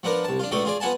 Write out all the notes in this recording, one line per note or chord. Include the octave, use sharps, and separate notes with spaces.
F3 B3 D4 A#4
C2 A5
D4 F4
C#2 B2 A3 A4 D5 D#6
F4 G#4 D5
F3 B3 F#5 G#5 A5